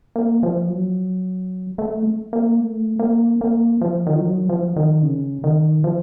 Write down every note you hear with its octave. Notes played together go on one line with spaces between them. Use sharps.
A#3
F3
F#3
A3
A#3
A3
A#3
A#3
F3
D#3
F3
F#3
F3
D#3
C#3
D#3
F3